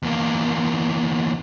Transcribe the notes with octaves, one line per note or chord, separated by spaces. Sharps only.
E2 A#3